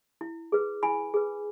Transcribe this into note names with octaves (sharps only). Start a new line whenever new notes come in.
E4
G#4 B4
E4 G#5 B5
G#4 B4